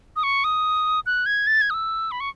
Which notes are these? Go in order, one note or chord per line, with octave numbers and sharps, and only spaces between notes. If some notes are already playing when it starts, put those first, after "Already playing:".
D#6
C#6
D#6
F#6
G#6
A6
G#6
D#6
E6
B5
C#6